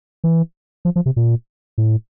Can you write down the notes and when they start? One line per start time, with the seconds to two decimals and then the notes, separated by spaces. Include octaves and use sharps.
0.24 E3
0.85 F3
0.96 F3
1.06 C3
1.16 A#2
1.78 A2